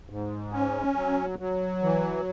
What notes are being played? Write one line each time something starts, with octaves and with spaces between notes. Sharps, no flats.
G#2
C#4
F#3
F#3
E3